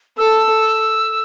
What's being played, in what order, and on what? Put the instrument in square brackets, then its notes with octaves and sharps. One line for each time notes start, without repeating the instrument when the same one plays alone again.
[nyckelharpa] A4 [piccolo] E6